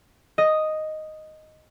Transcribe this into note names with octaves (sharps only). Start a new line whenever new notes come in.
D#5